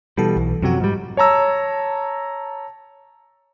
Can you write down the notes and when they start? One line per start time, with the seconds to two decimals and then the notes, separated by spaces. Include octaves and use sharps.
0.17 B2 E3 G3 A4
0.37 B1
0.62 F#2 C3 F3 F#3 F#4
0.80 G#2 G3
1.17 C#5 A5 A#5 E6